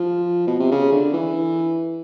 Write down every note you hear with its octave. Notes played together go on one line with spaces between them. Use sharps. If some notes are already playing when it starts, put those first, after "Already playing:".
Already playing: F3
B2
C3
C#3
D3
E3